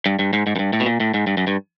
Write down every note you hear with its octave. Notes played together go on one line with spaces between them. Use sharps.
G2
G2
G#2
G#2
F#2
G2
A2
B2
A#2
A2
G#2
G2
F#2
G2